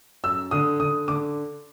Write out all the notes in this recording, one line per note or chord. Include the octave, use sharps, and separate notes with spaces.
F#2 E6
D3 D#6
D3 D#6
D3 D6